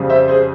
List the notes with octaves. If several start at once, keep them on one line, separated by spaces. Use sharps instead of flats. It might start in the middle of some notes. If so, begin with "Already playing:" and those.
Already playing: F2 C#3 G3
C5 E5
G#4 C5